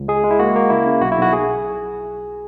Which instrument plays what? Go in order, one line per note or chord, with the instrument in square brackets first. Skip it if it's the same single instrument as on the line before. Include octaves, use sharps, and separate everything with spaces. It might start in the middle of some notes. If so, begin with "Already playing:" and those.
Already playing: [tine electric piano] C#2
G#3 G#4
G#3
E4
A#3 F#4
A#3
C#3 E4
C#3
B1 F#4
E4
B1 F#4
G#4